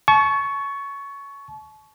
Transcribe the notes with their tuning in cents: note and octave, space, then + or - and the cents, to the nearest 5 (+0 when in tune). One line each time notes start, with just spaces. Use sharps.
A5 -35 C#6 +10